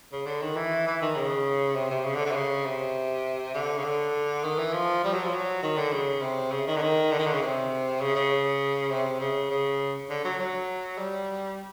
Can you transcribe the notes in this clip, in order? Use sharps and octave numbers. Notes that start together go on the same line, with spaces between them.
C#3
D3
D#3
E3
E3
D#3
C#3
C3
C3
C#3
D3
D3
C3
C#3
C3
D3
C#3
D3
D#3
E3
F3
G3
F#3
F3
F#3
D#3
D3
C#3
C3
C#3
D#3
D3
D#3
D3
D#3
D3
C#3
C3
C#3
C#3
C3
C#3
C#3
D3
F#3
F#3
G3